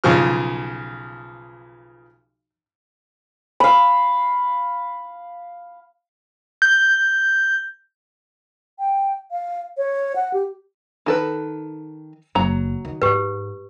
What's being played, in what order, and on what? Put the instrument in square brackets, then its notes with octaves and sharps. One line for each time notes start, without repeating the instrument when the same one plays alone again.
[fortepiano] B1 C#3 F3 F6
[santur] F5 B5
[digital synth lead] G6
[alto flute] G5
F5
C#5
F#5
G4
[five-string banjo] D#3 A4 B4
[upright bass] F#1 [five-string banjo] F#3 A#5
[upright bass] D#3
[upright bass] G#2 [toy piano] G4 B4